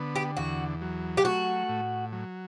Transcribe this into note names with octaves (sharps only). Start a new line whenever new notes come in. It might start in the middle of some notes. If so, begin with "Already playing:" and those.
Already playing: D3 B3
G4
E2 F#4
F#3
G4
A3 F#4
A2
F#3